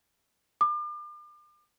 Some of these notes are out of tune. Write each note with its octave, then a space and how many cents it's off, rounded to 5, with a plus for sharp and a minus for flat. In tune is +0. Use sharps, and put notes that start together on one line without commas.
D6 +40